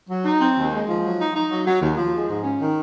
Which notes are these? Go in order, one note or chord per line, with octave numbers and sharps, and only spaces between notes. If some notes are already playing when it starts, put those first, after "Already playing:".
F#3
D#4
C4
D#2
G#3
F3
F#3
D#4
D#4
F#3
F#3
D#2
F3
G#3
G#2
C#4
D#3